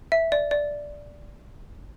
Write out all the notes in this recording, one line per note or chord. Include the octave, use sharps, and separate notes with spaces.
E5
D5
D5